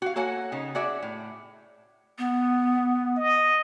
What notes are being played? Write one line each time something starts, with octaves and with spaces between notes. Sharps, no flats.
F#4 F5
A#3 F#4 A4 C#5 F#5 G#5
C#3 D#4
F#4 G#4 D5 E5
A2
B3
D#5